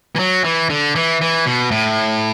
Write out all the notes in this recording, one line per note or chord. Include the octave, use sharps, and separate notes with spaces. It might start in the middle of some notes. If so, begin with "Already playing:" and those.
E3
F#3
E3
D3
E3
E3
B2
A2